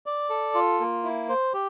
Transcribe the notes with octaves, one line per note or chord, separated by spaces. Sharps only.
D5
A4
F4
A#3
E4
C5
G4